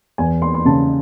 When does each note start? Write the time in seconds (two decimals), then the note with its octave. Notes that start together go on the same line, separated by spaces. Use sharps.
0.18 E2 G#5
0.42 C6
0.54 C6
0.65 C#3 A5